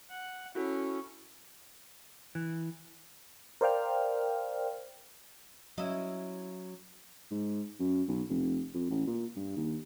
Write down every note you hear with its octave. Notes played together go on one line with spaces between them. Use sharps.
F#5
C#4 E4 F#4 A4
E3
A#4 C5 D5 F5 G5 F6
F#3 C#4 E4 D#5
G#2
F#2
B1
F1
F2
A1
A#2
G2
D#2